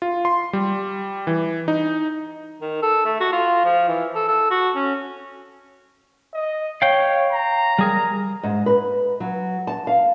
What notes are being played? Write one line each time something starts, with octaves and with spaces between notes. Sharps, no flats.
F4
C6
G3
E3
D#4
D#3
A4
A3
F#4
F4
F3
E3
A4
A4
F#4
C#4
D#5
C#5 F5 G5
A#5
G3 G#4 A#4
G#2
B4
F#3
A5
F5